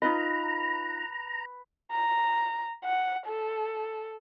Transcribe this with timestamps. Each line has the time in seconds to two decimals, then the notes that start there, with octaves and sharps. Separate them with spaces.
0.02 D#4 F4 B4 D#5 A#5
1.92 A#5
2.84 F#5
3.27 A4